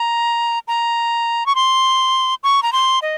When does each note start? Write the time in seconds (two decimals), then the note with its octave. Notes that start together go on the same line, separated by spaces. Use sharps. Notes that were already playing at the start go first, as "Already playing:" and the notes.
Already playing: A#5
0.68 A#5
1.46 C#6
1.55 C6
2.43 C#6
2.63 A#5
2.73 C6
3.02 D#5